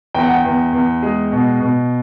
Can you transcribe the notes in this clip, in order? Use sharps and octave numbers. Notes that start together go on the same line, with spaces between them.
E2 G5
F#5
G5
E2
E2
G#3
B2
B2